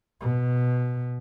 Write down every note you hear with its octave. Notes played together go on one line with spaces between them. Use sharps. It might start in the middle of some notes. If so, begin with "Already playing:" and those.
B2